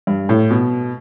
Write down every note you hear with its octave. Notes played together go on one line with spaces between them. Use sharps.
G2
A2
B2